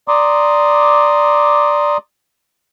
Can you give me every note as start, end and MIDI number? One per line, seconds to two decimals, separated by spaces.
0.08 1.97 74
0.08 1.97 82
0.08 1.97 84
0.08 1.97 86
0.08 1.97 87